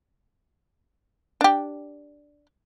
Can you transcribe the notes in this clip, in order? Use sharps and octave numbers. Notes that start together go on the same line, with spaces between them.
D4 G4